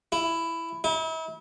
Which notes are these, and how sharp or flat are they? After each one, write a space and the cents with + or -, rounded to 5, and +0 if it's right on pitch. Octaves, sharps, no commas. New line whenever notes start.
E4 +10
E4 -40